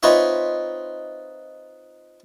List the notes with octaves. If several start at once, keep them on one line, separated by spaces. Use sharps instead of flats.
C4 D#4 F4 B4 C#5 E5